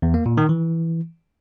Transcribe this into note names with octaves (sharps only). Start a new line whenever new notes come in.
E2
A#3
A#2
D#3
E3